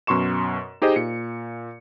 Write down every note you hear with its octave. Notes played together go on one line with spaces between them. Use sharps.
F#2 B2 C6 C#6 E7
D#4 G4 G#4 C5 D#5
A#2 C#7